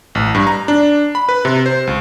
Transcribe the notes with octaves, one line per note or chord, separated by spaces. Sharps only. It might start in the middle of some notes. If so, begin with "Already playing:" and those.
A1
G2
A#5
D4
B5
B4
C3
C5
C#2